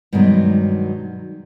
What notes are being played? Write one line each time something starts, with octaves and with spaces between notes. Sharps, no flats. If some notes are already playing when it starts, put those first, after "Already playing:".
G2 B2 D#3 F#3 G#3